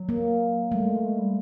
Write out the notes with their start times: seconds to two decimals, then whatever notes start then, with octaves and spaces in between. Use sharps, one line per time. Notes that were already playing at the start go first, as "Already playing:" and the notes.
Already playing: F#3
0.09 A#3
0.71 G3 A3
0.87 G#3
1.03 G#3
1.19 G3